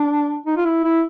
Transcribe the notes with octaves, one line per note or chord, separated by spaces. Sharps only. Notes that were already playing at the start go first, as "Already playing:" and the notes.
Already playing: D4
D#4
F4
E4
E4